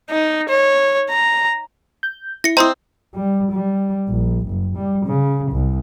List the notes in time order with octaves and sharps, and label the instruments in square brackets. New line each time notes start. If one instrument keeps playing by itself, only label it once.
[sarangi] D#4
C#5
A#5
[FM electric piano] G6
[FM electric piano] E4 [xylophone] A#6 C#7
[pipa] C4 [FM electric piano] E4 D#5 [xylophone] A#5 C6 D#6
[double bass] G3
G3
A#1
F#1
G3
C#3
C2